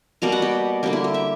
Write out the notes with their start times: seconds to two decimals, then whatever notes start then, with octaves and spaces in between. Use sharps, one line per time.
0.22 B2 G3 A#3 A#5
0.32 F#5
0.42 G4
0.83 D3 G3 A#3 G4
0.93 E4
1.04 G4
1.14 E5